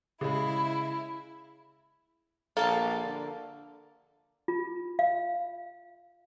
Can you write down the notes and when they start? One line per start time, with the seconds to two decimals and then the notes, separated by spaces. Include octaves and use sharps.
0.21 C#3 G#3 E4
2.57 A#1 A#3 A4 F5 A5
3.05 D3
4.48 F4
4.99 F5